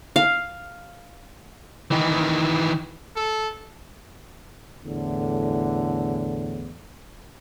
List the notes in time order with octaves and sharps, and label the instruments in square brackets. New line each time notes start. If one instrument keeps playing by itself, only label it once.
[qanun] F5
[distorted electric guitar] D#3 E3
[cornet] A4
[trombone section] E2 A2 D3